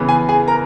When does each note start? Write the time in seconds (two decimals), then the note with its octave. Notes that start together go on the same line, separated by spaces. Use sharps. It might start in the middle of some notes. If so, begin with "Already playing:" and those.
Already playing: C#3 E3 B3
0.09 G#4 G#5
0.29 G#4 G#5
0.48 A#4 A#5